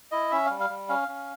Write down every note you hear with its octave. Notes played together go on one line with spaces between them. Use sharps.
E4 D#5
C#4 E5
G3 F5
F5
G3
C#4 F5
C#4